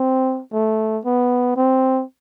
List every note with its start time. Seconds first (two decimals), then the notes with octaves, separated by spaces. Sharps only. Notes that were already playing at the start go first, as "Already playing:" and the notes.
Already playing: C4
0.53 A3
1.05 B3
1.56 C4